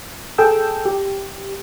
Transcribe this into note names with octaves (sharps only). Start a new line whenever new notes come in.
G#4 A4 G5 E6
G4